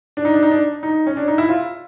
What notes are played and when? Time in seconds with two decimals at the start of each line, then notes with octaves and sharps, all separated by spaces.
0.17 D4
0.25 D#4
0.34 D4
0.43 D#4
0.51 D4
0.83 D#4
1.07 C#4
1.17 D4
1.28 D#4
1.38 E4
1.49 F4